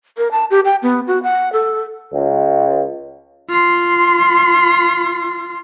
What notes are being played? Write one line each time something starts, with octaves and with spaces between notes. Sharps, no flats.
A#4
A5
G4
G5
B3
F#4
F#5
A4
C#2
F4 C6